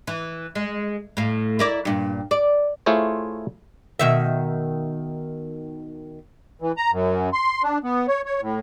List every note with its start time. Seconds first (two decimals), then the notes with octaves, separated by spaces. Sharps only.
0.07 E3
0.55 G#3
1.17 A2 F5
1.59 E4 A#4 D5
1.85 G2 A#2
2.31 D5
2.86 A3 E4 F4 G#4 C5 C#5
3.99 B2 D#3 E5
6.62 E3
6.77 A#5
6.92 F#2
7.33 C6
7.63 D4
7.84 B3
8.08 C#5
8.25 C#5
8.41 A2